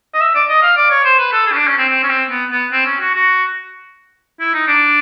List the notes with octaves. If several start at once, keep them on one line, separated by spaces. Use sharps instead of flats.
D#5
E5
D5
D#5
F5
D5
C#5
C5
B4
A4
G#4
C#4
D4
C#4
C4
C4
C#4
C4
B3
B3
C4
C#4
F#4
F#4
E4
D#4
D4